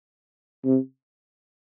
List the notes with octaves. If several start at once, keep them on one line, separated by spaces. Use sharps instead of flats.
C3